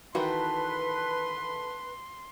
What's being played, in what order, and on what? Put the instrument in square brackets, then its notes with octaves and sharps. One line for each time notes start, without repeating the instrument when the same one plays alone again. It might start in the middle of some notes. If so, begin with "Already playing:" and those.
[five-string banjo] D#3 E3 F#4 [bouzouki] A3 [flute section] B4 [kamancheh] C6